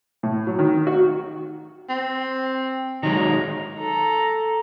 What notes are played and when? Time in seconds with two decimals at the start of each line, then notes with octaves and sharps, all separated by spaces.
0.23 A2
0.47 F#3
0.59 D#3
0.87 F#4
1.89 C4
3.03 D#3 F#3 G#3 A#5
3.78 A4 A#5